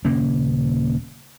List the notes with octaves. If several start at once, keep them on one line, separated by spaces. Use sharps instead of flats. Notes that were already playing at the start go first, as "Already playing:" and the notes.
D#1 C#3 A#3 C#4